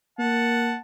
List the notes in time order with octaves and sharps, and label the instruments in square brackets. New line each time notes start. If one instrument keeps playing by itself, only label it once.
[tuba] A#3 [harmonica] F#5 A5